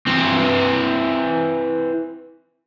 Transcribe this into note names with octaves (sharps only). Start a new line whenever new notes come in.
E3 C4